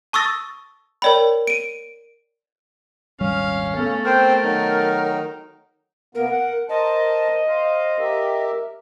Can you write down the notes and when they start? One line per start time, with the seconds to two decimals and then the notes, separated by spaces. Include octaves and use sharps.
0.13 A5 C#6 D#6 E6 A6 A#6
1.02 A#4 C#5 D5 G5 B5
1.47 D7 D#7
3.20 D#1 G#1 G3 C#4 F5
3.76 C#3 A3 B3 A4
4.05 C4 A#4 C5 G5
4.44 D#3 F#3 D#4
6.15 B2 A#3 B3 A#4
6.30 F#5
6.69 A#4 C5 D#5 A5
7.47 C5 F5
7.98 G4 A#4 E5